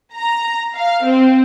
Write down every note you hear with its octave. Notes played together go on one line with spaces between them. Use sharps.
A#5
F5
C4